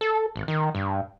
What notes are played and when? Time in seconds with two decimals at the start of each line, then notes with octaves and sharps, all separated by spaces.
0.01 A4
0.36 G#1
0.48 D#3
0.75 G2